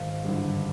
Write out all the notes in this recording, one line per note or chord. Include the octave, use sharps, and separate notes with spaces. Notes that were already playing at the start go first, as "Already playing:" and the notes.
Already playing: G#1 F5
G2 D3